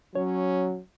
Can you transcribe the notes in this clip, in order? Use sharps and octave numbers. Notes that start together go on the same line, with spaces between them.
F#3 C#4 C#5